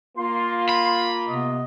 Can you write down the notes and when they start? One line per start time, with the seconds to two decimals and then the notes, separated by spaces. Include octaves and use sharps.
0.18 A#3 F4 C6
0.69 B5
1.26 C3 B3 D#5